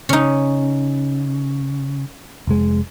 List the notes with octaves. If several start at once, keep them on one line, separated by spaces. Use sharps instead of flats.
C#3 C#4 D#4
F1 G#3